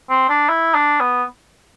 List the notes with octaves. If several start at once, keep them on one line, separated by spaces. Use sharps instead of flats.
C4
D4
E4
D4
B3